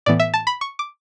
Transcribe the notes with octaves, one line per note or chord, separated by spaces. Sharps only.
A2 E3 B3 D5
E5
A5
B5
C#6
D6